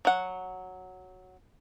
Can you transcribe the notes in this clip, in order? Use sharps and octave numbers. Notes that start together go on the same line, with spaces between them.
F#3 F#5